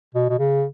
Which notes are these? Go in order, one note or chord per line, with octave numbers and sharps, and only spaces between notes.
B2
B2
C#3